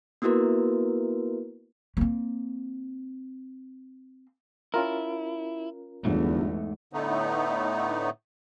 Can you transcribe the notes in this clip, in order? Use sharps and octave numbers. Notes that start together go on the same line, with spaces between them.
A#3 B3 E4 F#4 A#4 B4
A#3 C4
C#4 E4 F4 A#4
G1 E2 G#2 A3
A2 D3 A3 B3 D#4